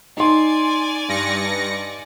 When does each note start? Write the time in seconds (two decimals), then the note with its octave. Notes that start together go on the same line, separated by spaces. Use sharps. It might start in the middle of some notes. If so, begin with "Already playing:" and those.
0.17 D#4 D5 G#5 C6
1.08 G2 A#6 C#7